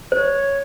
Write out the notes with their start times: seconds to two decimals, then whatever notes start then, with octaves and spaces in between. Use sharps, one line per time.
0.12 C5 C#5